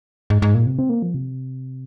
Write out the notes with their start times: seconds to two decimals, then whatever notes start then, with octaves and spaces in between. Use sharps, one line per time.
0.30 G#2
0.42 G#2
0.55 A#2
0.66 C3
0.79 C4
0.89 A#3
1.02 F3
1.14 C3